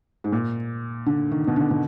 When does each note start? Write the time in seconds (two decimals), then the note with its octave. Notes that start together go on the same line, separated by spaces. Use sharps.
0.24 G#2
0.32 A#2
1.06 D3
1.32 D#3
1.47 B2
1.56 D3
1.70 B2